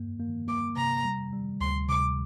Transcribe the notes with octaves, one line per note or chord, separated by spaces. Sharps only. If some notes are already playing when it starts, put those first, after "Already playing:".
Already playing: G2 A#3
A#3
A#3 D6
C3 A#5
G3
G3
D2 C6
C3 D6